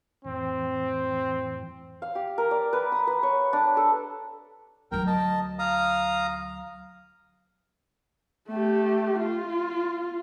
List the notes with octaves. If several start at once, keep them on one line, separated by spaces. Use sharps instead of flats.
F2 A2 E3 C4
F5
G4
A#4
D5
B4
D#6
B4
C#5
D4
A4
D2 F#3 A#4 G5
D#5 A5
F5 A#5 D#6
A3 G4
F4